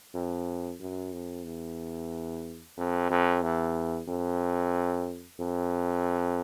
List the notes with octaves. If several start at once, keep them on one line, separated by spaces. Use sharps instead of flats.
F2
F#2
F2
E2
F2
F2
E2
F2
F2